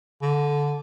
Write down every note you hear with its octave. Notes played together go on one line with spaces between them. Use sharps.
D3